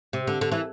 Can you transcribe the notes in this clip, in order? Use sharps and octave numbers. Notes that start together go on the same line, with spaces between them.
C3
D3
D3
E3